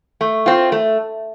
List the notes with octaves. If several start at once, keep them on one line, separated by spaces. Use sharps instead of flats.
A3
C4 F4
A3